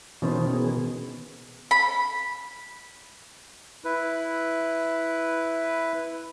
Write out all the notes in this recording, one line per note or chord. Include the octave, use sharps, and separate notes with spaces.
B2 D#3 E3 C#4 C5
B3 G#4
B5
E4 B4